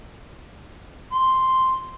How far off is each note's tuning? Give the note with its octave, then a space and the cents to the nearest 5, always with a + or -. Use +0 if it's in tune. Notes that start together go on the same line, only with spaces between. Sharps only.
C6 +0